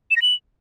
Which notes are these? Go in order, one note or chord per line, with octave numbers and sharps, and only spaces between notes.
E7
A#6
F#7